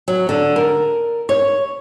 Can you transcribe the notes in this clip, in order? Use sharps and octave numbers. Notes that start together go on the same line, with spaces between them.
F#3
D3
A#4
C#5